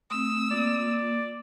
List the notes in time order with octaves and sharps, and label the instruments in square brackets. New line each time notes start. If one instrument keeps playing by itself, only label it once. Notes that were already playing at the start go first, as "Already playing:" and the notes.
[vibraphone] A3 C4 [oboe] D#6 [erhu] E6
[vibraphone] A#3 F4 [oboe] D5